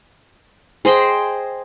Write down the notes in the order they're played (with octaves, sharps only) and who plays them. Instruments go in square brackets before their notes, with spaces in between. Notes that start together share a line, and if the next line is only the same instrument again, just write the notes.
[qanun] G#4 C5 D#5 G5